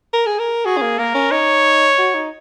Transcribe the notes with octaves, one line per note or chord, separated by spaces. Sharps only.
A#4
G#4
A#4
F#4 G#4
C#4
A#3
A#3 A#4
C#4
D#4 C#5
F#4
D#4